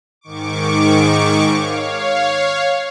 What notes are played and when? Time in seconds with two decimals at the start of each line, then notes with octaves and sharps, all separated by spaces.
0.21 G#2 D#3 C#6 D6
1.53 C#5 F5